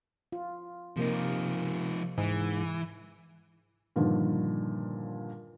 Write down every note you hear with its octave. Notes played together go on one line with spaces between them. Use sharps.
F4
C3 F3 A#3 D#4
G#2 E3
G2 A#2 D3 D#3 F3